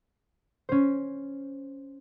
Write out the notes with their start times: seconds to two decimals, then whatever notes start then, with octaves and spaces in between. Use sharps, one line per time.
0.69 C#4 C5